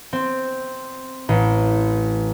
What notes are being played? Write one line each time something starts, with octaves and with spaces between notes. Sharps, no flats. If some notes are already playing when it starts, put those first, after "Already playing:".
C4
A1